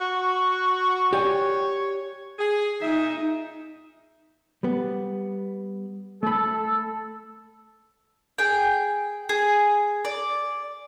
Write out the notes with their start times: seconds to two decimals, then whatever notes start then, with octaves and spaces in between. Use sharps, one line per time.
0.01 F#4 C#6
1.13 G4 C#5 D5 G#5
2.39 G#4
2.81 A#2 D#4 E5
4.63 G3 B3
6.23 A3 A4 B5
8.38 G#4 G5
9.29 G#4
10.05 D5